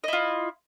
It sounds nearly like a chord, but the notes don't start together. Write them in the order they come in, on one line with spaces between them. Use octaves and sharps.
D#5 E4 F4